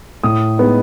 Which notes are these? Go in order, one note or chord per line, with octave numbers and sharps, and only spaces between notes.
A2 D#6
G#3 B3 D#4